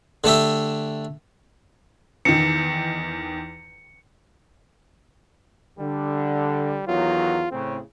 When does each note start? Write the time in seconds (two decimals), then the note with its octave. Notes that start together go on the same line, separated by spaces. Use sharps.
0.24 D3 A3 G4 E5
2.25 E2 D#3 C#7
5.79 D3 G3
6.87 E2 D#3 F#3 F4
7.51 A2 C#3 C4